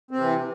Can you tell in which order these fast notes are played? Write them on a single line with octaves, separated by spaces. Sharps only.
C4 C3 E3